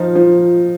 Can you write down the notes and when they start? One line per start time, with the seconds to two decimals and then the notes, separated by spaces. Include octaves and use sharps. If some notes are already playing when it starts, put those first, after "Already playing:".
Already playing: F3 D#4 F4
0.15 F3